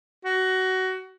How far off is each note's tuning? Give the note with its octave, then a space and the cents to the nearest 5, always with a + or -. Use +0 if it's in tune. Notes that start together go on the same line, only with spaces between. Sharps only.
F#4 +20